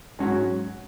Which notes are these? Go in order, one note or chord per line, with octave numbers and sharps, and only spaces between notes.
G#2 F#3 C#4 F#4